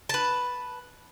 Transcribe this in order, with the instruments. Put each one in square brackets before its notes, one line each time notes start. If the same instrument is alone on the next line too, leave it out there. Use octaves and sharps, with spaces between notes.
[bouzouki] B4 A5